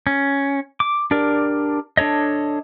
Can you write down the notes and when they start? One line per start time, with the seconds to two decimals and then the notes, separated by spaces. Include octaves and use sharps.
0.07 C#4
0.80 D6
1.11 D4 G4 A#4 D5
1.97 D4 A4 C#5 D#5